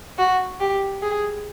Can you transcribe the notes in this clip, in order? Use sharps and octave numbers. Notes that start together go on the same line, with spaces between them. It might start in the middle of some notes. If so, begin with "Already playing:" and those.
F#4
G4
G#4